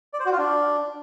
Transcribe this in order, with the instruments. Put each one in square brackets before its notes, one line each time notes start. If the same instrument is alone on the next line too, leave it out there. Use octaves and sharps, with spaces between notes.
[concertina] D5
C5
F#4
F4
D4